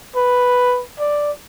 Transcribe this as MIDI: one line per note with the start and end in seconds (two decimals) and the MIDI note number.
0.16 0.82 71
0.99 1.32 74